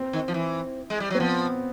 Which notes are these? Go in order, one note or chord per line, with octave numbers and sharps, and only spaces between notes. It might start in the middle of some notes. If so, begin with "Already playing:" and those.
Already playing: C4
D#3
F3
E3
G#3
G3
F#3
C4
F3 B3